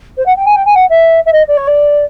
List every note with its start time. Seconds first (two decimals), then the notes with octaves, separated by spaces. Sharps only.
0.17 C5
0.26 F#5
0.36 G5
0.46 G#5
0.55 G5
0.65 G#5
0.75 F#5
0.89 E5
1.25 E5
1.32 D#5
1.48 D5
1.57 C#5
1.67 D5